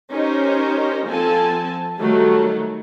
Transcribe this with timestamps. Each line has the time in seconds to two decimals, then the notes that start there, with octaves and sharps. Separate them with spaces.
0.12 C#4 D#4 G4 A#4 C5
1.07 F3 C4 A4 G#5 A5
1.99 D#3 F#3 G3 A3